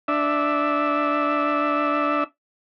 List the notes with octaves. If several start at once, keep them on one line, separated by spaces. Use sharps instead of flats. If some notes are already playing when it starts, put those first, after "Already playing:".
D4 E5